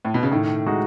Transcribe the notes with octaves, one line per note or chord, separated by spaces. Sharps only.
A2
B2
C#3
A2 D#3
G#3 D#4 F#4